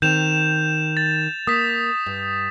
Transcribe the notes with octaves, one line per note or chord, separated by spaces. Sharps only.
D#3 C4 G6 E7 F7
A6
A#3 D#6 B6
G2